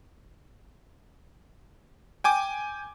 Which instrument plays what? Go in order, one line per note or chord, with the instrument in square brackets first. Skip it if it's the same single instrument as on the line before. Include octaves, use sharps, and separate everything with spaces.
[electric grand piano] G5 G#5 D6